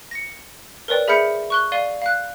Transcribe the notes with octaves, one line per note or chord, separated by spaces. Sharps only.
A#6 C#7
A#4 B4 C#5 D5 G5
G#4 E5 B5 F6 G6 C#7
C#6 F#6 G7
D5 F5 D#7 G7
F5 F#6